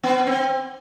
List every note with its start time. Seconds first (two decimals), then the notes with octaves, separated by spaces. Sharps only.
0.03 B3
0.27 C4